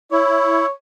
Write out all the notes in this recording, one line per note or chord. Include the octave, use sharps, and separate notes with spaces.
E4 C#5